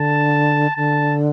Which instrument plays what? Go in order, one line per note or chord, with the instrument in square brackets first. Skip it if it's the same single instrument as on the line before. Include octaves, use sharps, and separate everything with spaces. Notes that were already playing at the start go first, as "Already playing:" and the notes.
Already playing: [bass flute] D3 [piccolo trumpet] A5
[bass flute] D3 [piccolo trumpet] A5